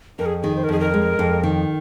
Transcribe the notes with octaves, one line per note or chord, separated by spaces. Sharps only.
F2 A#4
G#4
D#3 G#4
C5
A#4
F2 G#4
A#4
G#3
F2
D#3